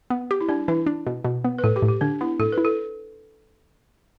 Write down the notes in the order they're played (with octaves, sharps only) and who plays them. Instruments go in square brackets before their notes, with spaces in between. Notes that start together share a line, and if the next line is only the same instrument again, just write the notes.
[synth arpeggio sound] B3
G4
[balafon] E4
[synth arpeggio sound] G3 [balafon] D4
[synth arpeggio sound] E3 [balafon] E4
[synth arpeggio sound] D4
B2
B2
B3
[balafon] B4
[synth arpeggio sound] A2 [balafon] A4
[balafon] G4
[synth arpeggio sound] A2
[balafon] G4
[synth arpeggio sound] D3 [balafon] D4
[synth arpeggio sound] B3 [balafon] E4
[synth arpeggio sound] A2 [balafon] A4
[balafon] B4
[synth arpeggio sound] E4
[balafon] A4